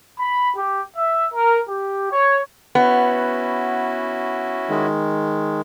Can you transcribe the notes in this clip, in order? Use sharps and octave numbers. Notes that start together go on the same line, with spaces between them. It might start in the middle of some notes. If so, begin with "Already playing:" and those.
B5
G4
E5
A#4
G4
C#5
B3 C#4 E4 F#4
D#3 G#3